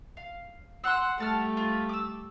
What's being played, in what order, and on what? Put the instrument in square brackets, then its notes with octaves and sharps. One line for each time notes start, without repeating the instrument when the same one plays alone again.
[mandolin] F5
[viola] F#5 [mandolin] C6 E6
[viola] G3 A3 [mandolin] F#5 A5 F6
[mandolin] F4
D6 E6